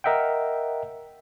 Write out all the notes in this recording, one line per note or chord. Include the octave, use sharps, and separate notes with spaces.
A#4 D#5 E5 F#5 G5